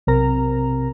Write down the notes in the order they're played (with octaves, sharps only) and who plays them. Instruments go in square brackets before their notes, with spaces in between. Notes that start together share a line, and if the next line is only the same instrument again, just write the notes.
[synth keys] B1 C3 C4 A#4 A#5